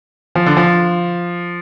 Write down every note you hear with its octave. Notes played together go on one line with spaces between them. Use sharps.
F3
D3
F3